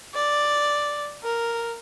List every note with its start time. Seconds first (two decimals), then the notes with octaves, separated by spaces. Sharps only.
0.14 D5
1.23 A#4